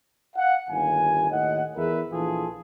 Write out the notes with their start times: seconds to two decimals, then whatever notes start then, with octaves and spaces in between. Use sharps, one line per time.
0.36 F5 F#5
0.70 G1 D#2 G#5
1.31 D#2 A2 D#5 F#5
1.76 E2 G#4 A#4 B4 E5
2.12 A#1 E3 F4 G#4 A4